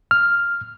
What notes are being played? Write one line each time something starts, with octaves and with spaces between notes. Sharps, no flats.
F6